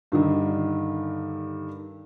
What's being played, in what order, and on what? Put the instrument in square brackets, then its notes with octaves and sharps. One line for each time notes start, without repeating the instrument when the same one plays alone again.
[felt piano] G2 D3 D#3